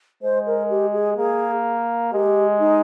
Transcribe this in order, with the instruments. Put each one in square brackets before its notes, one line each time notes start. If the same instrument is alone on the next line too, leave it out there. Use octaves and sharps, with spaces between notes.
[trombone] G#3 [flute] C5
[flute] A#4
G4
G#4
[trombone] A#3 [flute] G#4
[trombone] G#3 [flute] G4
[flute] D#4